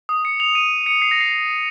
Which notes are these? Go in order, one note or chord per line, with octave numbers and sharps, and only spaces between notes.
D#6
C#7
F7
D#7
C#7
C7
A#6
C7